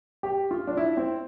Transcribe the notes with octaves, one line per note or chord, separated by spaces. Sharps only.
G4
F4
D4
E4
C4